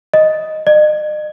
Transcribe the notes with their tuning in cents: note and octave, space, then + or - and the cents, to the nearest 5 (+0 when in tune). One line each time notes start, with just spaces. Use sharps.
D#5 +0
D#5 -45